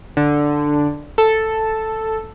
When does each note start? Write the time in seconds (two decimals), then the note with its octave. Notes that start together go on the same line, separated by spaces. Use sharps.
0.17 D3
1.18 A4